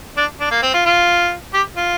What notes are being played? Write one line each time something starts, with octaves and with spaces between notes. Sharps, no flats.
D4
D4
A#3
C4
F4
F4
G4
F4